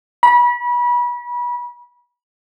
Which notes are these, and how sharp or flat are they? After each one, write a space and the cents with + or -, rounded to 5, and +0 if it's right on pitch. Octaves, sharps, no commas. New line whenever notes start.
B5 -30